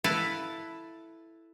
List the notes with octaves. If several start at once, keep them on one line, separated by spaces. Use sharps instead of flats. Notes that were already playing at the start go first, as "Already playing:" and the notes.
E4 A4 B4 F5 A5